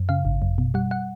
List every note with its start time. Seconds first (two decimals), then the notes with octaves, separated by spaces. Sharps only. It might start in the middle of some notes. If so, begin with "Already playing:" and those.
Already playing: F#2
0.09 C#3 F5
0.25 G#1
0.42 F#2
0.58 B2
0.74 G3 F#5
0.91 F#5